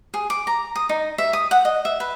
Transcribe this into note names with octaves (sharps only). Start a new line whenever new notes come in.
G#4
D6
A#5
D#6
D#4
E5
D#6
F#5
D#5
E5
B4